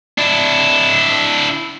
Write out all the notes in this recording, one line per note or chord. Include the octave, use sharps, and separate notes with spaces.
D4 E4